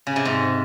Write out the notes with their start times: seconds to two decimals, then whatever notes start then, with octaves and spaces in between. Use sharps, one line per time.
0.07 C#3
0.16 C3
0.25 G#2